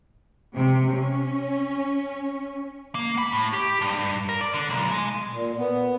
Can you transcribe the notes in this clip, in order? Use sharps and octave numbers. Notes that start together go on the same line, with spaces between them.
C3
C#4
A#3
B5
A2
G4
G2
A#4
D5
D3
B1
G#3
A#2
B3